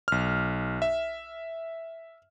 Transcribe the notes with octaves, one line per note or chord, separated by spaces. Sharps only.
B1 F6
E5